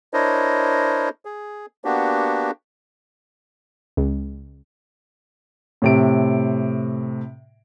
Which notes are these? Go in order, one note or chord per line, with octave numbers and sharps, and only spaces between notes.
D4 E4 A#4 C5 C#5 D#5
G#4
A#3 B3 D4 F#4 G4
C#2
A2 C3 D7